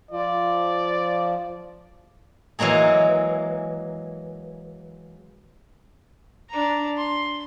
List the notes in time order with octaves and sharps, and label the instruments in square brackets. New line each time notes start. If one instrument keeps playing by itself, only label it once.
[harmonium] F3 [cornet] D5
[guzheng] E3 F#3 G#3 A#3 G#4
[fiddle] D4 A#5
C6